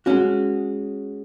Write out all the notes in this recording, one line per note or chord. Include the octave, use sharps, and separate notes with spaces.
G#3 C#4 F#4